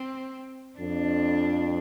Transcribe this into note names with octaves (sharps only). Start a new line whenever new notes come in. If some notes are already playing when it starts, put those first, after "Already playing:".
Already playing: C4
F2 D4